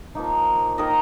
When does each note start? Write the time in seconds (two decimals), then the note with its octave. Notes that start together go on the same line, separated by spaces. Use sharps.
0.15 F3 A#3 D#4
0.78 D#3 A#3 D#4 A#4 D#5